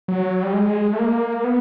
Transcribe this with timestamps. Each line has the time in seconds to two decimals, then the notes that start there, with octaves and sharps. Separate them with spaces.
0.08 F#3
0.43 G3
0.53 G#3
0.93 A3
0.99 A#3
1.44 B3